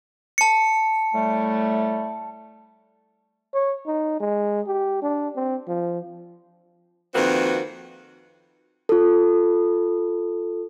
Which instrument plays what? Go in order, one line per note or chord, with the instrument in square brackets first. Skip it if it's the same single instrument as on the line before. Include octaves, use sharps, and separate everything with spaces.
[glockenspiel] A5 C#7
[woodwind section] A2 G3 A3
[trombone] C#5
D#4
G#3
G4
D4
C4
F3
[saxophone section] F2 D#3 A#3 C4 F#4 B4
[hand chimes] F4 A4